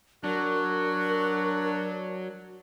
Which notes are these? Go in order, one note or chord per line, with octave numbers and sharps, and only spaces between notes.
F#3 D4 F#4 A#4